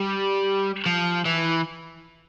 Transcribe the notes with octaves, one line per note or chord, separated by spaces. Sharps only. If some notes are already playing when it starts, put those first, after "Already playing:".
Already playing: G3
F3
E3